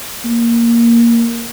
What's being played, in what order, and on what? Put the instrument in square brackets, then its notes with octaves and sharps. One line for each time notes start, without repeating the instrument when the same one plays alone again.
[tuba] A#3